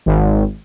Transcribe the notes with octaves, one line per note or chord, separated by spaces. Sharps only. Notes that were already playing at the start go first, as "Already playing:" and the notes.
G#1